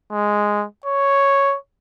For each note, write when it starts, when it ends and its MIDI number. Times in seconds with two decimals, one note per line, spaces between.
0.12 0.65 56
0.85 1.56 73